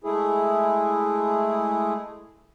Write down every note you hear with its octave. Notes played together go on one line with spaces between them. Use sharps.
G#3 A3 E4 G#4